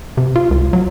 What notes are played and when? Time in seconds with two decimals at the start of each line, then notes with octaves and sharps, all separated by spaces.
0.17 C3
0.36 F4
0.51 C#2
0.73 F#3